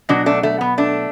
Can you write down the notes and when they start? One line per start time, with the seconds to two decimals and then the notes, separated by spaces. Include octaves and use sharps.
0.09 B2 F#3 D4 F#4
0.26 A3 D4
0.43 A3
0.61 B3
0.78 A3 D4